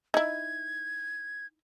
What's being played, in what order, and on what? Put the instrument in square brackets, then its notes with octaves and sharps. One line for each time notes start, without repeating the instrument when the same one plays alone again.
[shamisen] D#4 E4 [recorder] G#6